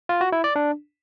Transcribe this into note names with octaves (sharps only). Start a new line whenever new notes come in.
F4
F#4
E4
D5
D4